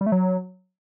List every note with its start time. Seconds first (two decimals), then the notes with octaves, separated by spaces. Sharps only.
0.01 G3
0.06 A3
0.12 F#3